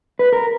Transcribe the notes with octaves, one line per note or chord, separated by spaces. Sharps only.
B4
A#4